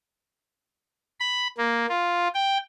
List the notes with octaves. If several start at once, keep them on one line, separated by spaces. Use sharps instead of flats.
B5
A#3
F4
G5